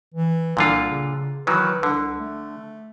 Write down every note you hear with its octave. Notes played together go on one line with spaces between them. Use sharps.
E3
C2 A#2 D3 F4
C#3
D#3 E3 F#3 B4
C2 D3
A3